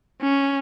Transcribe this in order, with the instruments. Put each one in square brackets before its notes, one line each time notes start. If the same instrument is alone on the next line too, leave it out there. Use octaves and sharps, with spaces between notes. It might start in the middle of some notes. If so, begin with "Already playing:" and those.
[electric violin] C#4